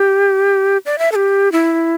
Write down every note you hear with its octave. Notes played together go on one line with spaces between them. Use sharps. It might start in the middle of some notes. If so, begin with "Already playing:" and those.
Already playing: G4
D5
E5
A4
G4
E4